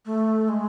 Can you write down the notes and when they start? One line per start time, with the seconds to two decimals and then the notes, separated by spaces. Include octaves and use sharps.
0.06 A3
0.49 G#3